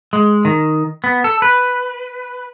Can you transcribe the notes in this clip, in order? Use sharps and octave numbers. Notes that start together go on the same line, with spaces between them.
G#3
D#3
B3
A4
B4